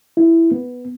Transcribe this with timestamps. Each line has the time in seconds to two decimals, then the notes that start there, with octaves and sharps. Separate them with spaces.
0.17 E4
0.51 B3